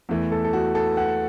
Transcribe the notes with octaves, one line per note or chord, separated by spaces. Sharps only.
E2 E3 A3
A4
A4
F#4
A4
F#5